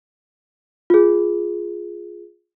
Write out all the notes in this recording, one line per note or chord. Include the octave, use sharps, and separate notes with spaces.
F4 G#4